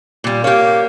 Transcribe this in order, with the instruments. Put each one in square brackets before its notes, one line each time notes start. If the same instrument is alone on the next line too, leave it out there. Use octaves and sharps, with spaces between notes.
[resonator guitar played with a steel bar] A#2 G3
[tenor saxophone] A#3 [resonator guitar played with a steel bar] G4 C#5